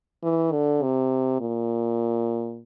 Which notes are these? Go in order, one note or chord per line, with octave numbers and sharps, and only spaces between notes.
E3
D3
C3
A#2